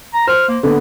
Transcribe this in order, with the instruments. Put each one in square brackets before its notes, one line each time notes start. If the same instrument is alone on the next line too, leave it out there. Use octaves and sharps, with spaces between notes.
[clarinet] A#5
[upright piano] C5 [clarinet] F6
[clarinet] A#3
[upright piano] D3 B3 [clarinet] A#3